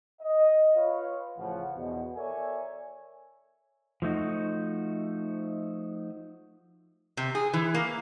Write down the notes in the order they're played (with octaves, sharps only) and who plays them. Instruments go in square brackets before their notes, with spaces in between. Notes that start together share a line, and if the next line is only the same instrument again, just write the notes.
[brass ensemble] D#5
F4 B4 C#5 F5
A1 C#3 F3 F#5
E2 B2
A4 A#4 C#5 D5 E5 G#5
[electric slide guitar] F3 A3 D#4 F#4
[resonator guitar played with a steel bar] C3
G#4
E3
A#3